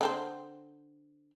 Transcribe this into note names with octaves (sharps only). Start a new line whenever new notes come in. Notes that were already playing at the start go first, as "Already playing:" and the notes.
D3 C4 C5